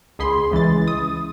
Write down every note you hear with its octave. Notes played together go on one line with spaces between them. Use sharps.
C#2 G#4 B5 C6
C#2 E3 G#3 A6
D#6